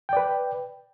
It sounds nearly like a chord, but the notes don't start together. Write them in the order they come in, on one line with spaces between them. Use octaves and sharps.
G5 D5 B4